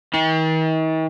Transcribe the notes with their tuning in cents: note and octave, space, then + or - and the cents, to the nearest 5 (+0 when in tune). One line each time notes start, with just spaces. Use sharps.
D#3 +45